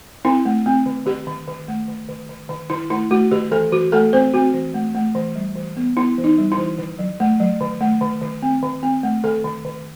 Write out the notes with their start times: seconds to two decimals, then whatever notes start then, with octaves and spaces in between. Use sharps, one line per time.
0.25 C4 E4
0.45 A3
0.66 C4
0.86 D#3
1.06 D#3 G4
1.27 D#3
1.47 D#3
1.68 A3
1.88 D#3
2.09 D#3
2.29 D#3
2.49 D#3
2.70 D#3 E4
2.90 A3 E4
3.11 A3 F#4
3.31 D#3 G4
3.51 E3 A4
3.72 E3 F#4
3.92 A3 A4
4.13 C4 C5
4.34 C4 F#4
4.54 E3
4.74 A3
4.95 A3
5.15 E3
5.35 G3
5.56 E3
5.77 B3
5.97 B3 E4
6.18 E3
6.24 D#4
6.38 G3
6.52 E4
6.58 E3
6.79 D#3
6.99 F#3
7.20 A3
7.40 F#3
7.61 D#3
7.81 A3
8.01 D#3
8.22 D#3
8.42 C4
8.63 D#3
8.83 C4
9.03 A3
9.24 D#3 A4
9.45 D#3
9.65 D#3